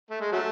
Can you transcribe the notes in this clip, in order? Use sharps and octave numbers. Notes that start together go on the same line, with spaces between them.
A3
G#3
F#3 A3